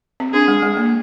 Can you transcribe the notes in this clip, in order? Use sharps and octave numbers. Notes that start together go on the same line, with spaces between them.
C4
D4 G#4
G#3
G#3
A#3